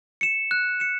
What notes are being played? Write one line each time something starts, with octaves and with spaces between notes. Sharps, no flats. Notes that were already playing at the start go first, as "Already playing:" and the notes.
C#7 E7
F#6
C#7 E7